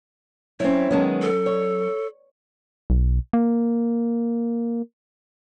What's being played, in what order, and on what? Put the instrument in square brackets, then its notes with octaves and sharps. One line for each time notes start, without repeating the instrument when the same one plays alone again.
[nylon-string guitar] F#3 C#4 [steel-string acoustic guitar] C4 E4 [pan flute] C#5
[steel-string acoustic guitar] D#3 G#3 B3 [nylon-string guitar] F#3 C#4 A5
[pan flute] A4
[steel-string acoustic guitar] C#5
[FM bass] B1
A#3